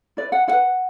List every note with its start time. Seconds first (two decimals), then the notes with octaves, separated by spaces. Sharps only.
0.17 E4 B4 D5
0.32 F#5
0.48 E4 B4 F#5